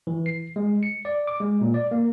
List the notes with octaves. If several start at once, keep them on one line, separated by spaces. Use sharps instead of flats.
E3
C7
G#3
C#7
D5
D6
G#3
A#2
D5
A#3